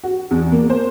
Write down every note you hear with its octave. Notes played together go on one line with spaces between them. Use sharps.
F#4
E2
A#3
C5